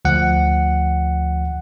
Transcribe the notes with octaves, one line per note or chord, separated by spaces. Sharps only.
D2 F3 F#5